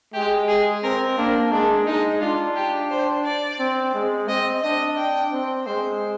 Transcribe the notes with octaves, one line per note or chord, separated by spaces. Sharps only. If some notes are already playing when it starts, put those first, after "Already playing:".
G#3 G4
G#4
C4 A#4
A#3 D4
G#3 D4
G#3 D#4
D4 F4
G4
C5
D5
C4
G#3
C4 D#5
D4 D#5
G5
C4
G#3 C5